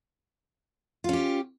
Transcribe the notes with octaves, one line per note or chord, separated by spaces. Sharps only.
C#4 F4 G4